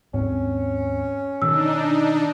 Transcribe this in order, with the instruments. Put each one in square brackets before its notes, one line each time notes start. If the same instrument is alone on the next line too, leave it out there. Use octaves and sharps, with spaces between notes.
[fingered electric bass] D#2 G#2 C4 [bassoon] C#4
[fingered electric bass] B2 D3 D#3 [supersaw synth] D4 D#4 [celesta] E6